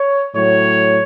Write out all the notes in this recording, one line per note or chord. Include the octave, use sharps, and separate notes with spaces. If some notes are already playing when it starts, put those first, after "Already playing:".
Already playing: C#5
A2 F#3 C#5